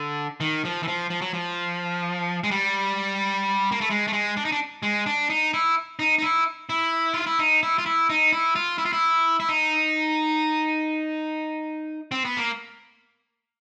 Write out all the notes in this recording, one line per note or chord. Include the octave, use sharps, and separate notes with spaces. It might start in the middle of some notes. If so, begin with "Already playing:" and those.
Already playing: D3
D#3
F3
E3
F3
F3
F#3
F3
G#3
G3
A#3
A3
G#3
A3
G#3
D4
D#4
D4
G#3
D4
D#4
E4
D#4
D#4
E4
E4
F4
E4
D#4
E4
F4
E4
D#4
E4
F4
E4
F4
E4
E4
D#4
C4
B3
A#3